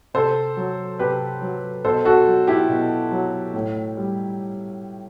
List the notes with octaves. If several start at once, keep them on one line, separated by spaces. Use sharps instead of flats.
C3 A4 C5
F#3
C3 G4 B4
F#3
B2 A4 C5
F#4 A4
F#3
E4 G4
B2
F#3
A2
G3